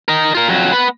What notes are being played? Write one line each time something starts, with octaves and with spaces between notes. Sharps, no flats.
A#4 D#5
F4 A#4
F2 F#3
B3 B4